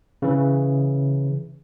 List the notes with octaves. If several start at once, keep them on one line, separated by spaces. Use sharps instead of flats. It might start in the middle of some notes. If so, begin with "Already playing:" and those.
C#3 E3